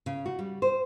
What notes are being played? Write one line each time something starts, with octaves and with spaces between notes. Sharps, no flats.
C#3
F#4
G3
C5